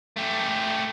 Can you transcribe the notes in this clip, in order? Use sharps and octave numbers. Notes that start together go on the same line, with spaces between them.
A3 G4